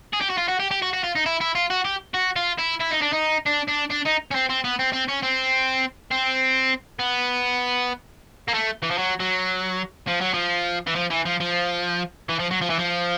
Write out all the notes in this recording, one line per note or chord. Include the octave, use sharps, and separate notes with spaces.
G#4
G4
F#4
F4
F#4
G4
G4
F#4
F#4
F4
D#4
E4
E4
F4
F#4
G4
F#4
F4
E4
E4
D#4
D4
D#4
D4
D4
D4
D#4
C#4
C4
C4
B3
C4
C4
C#4
C4
C4
B3
A#3
A3
E3
F3
F#3
F#3
F3
F#3
F3
E3
F3
E3
F3
F3
E3
F3
F#3
F3
E3
F3